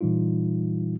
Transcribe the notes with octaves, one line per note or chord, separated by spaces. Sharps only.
A#2 E3 G3 D#4 F4